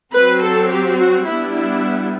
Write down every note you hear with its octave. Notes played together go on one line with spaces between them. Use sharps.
F#3 C4 B4
A4
G4
F#4
G3 B3 D4 E4
E4